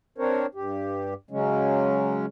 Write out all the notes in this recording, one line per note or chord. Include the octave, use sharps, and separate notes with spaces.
C4 D4 A#4 C5 C#5
G2 G4
C#3 F#3 G#3 C#4